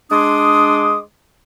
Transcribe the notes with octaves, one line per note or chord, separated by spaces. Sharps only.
G#3 D4 C6 D6 D#6